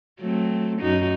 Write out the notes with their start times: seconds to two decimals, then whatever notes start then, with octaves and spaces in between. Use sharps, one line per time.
0.20 F#3 A3 C4
0.79 F#2 D#4 F#4